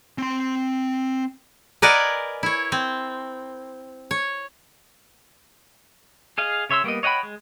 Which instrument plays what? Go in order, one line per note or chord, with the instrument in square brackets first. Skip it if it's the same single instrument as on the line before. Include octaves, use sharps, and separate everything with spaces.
[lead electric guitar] C4 C6
[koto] A#4 B4 D5 D#5 F#5 G#5
E4 C#5
C4
C#5
[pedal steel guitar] G#4 D#5 F5
C#3 C#5 E5 C6 E6
G3 A#3 B3 D#5
C#5 D#5 F#5 G5 B5
G#3